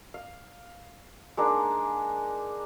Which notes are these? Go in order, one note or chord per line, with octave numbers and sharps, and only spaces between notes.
F5
G#3 A#3 D4 D#4